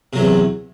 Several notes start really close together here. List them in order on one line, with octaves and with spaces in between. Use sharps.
C3 F#3 E2